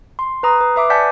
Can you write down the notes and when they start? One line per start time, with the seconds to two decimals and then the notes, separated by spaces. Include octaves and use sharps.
0.19 C6
0.43 B4 A#5 D#6
0.61 B4
0.76 B4 E5 D6
0.90 D5 F#5 G#5 A5 G6 B6